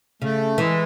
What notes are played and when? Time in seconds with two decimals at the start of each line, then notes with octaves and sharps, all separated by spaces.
0.22 C#3 A3
0.58 E3 G#3